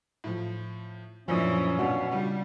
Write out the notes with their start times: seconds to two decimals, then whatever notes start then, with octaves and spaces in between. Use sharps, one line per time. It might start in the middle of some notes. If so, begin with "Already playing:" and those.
0.24 A2 F3
1.28 F#2 A#2 E3 F3 C#4 D4 D#6
1.79 B2 D4 F#4 F5
2.11 C#3 G3 D4 F4